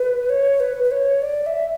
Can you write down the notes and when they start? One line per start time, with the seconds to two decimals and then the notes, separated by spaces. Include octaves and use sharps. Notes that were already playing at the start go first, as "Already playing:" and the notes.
Already playing: B4
0.29 C#5
0.60 B4
0.84 B4
0.91 C#5
1.22 D5
1.46 E5